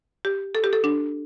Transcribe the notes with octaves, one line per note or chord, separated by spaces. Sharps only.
G4
A4
G4
A4
D4